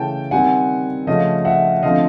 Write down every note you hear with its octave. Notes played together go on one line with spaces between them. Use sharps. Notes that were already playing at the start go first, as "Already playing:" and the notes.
Already playing: C#3 E3 A3 C#4 G5 A5
D#3 G3 C4 F#5 G#5
C#3 F3 A3 C#4 D#5 F5
E5 F#5
D3 F3 A3 C4 D#5 F5